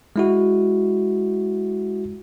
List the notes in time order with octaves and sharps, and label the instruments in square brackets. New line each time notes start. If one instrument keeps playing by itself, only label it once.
[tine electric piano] G#3 E4 F#4